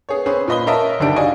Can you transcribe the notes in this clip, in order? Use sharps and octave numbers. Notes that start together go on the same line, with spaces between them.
B3 G#4 C#5
C4 C#4 G#4 B4
A#2 B4 D#5 B5 G7
C#4 A#4 D#5 E5 A5
F#1 D3 D#3 D4 G4 D7
F#4 D5 D#5 F5 G#5